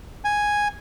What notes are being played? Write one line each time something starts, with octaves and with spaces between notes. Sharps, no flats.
G#5